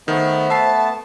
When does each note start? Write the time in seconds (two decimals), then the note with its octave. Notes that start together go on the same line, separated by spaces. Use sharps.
0.08 D#3 A3 B3 C5
0.50 E5 A5 C7